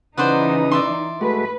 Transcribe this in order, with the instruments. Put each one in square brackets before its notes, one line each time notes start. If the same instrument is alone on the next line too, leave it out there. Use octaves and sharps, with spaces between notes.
[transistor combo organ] C#3 B4 D#6 [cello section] E3 D#4 [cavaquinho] C5 D5 F#5
[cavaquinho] D5 E5 C6
[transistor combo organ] G#3 A3 F#4 [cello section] B4